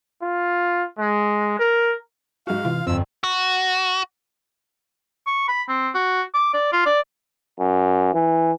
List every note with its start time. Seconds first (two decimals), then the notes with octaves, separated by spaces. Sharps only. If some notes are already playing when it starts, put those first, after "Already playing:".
0.22 F4
0.98 G#3
1.59 A#4
2.47 G#2 F#4 F5
2.65 C3 E3 F4
2.87 G1 F2 C4 E6
3.24 F#4
5.26 C#6
5.48 B5
5.69 C4
5.94 F#4
6.34 D6
6.53 D5
6.73 F4
6.86 D5
7.60 F#2
8.14 E3